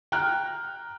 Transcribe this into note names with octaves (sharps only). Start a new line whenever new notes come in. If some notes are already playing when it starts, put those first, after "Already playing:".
G5 A#5 F6 F#6